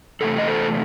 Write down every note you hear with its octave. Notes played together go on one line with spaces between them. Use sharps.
E2 C3 A3 A4
D#5
A4 C5